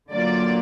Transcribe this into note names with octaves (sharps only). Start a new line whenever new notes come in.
D3 F#3 A#3 F4 D5